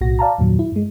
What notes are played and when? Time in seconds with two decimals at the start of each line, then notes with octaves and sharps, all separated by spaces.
0.01 B1 A2 F#4 A#6
0.19 D5 F5 A5 A#5
0.38 E2 G2 A#2 D#3 F#3
0.59 E4
0.72 G2 G#3